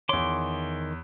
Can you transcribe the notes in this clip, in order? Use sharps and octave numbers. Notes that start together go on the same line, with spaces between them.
E2 D#3 C#5 C6 D6